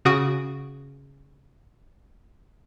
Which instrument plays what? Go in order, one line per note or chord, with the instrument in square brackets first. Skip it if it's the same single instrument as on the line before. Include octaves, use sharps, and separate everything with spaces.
[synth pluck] C#3 F#4 D#6 D7